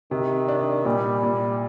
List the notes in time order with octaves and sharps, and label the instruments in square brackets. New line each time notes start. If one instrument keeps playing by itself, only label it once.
[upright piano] C3 [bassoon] D#3
[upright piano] D4
[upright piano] A#2 [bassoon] G3
[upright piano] A#2